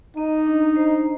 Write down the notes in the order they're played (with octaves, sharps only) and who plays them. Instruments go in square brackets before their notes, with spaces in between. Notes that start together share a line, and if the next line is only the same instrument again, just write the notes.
[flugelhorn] D#4 [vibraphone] D#5
[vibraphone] D4
C5